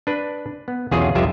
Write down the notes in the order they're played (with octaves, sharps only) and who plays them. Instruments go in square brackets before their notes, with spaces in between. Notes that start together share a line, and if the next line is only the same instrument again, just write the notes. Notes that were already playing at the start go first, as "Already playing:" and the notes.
[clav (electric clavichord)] D4 B4
B3
B1 E2 C#4 F4 F#4 G#4
C2 F2 C3 F4 G4 E5